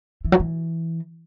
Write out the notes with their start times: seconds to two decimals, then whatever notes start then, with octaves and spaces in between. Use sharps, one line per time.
0.24 E3
0.32 F#3
0.40 E3